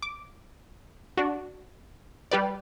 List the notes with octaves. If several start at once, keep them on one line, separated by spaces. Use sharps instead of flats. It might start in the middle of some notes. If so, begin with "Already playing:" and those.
D6
D4 F#4
G3 G4 B4 D5